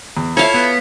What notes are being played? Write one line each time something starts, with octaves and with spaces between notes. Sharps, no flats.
E2
E4 F4 A4 C#5 E5 F5
B3